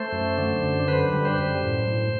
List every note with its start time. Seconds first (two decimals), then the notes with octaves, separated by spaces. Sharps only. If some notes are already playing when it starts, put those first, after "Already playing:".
Already playing: A3 C5
0.12 F#2
0.38 D3
0.63 F#2
0.87 D3 B4
1.13 G3
1.25 C5
1.38 F#2
1.63 A2
1.88 A2